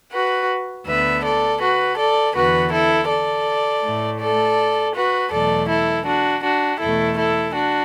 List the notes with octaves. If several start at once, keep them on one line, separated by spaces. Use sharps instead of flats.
F#4 B4
D2 D3 B3 B4 E5
A4 D5
F#4 B4
A4 D5
E2 D3 B3 F#4 B4
E4 A4
A4 D5
A2 A3
A4 D5
F#4 B4
E2 B2 F#3 A3 A4 D5
E4 A4
D4 F#4
D4 F#4
E2 B2 A3 E4 A4
E4 A4
D4 F#4